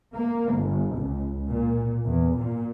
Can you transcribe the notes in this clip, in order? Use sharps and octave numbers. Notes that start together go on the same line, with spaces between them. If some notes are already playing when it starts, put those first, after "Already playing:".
A#3
G1
C#2
A#2
E2
A#2